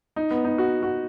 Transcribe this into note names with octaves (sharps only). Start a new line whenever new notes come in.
D#4
B3
D#4
F#4
F#4